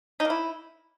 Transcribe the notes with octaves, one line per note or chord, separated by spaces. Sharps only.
D#4
A#3
E4